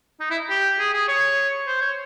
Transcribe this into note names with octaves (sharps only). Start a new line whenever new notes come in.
D#4
E4
G4
G#4
G#4
C#5
C5
C#5